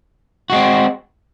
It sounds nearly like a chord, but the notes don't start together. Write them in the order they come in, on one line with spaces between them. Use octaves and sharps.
F#4 G#3 C4